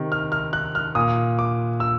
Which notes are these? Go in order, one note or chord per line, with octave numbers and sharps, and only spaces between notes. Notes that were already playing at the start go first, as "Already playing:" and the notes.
Already playing: C3 D#3
F6
F6
F#6
F6
A#2 D#6
D6
E6